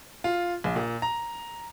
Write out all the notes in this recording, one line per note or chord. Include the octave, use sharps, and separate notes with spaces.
F4
A#1
A#2
A#5